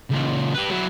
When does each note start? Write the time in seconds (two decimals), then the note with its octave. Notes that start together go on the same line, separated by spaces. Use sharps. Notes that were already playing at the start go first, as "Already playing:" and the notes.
0.11 C#2 A#2
0.54 G4 B4
0.69 F#3 E4